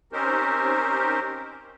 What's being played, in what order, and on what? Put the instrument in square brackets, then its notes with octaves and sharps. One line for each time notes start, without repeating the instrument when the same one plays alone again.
[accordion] C4 C#4 D#4 G4 A#4 C5